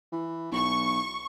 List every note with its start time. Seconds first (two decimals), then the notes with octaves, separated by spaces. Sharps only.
0.12 E3
0.52 B1 C#6